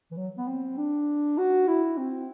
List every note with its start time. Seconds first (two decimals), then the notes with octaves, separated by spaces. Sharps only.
0.11 E3
0.17 F#3
0.37 B3
0.47 C4
0.77 D4
1.38 F#4
1.67 E4
1.97 C4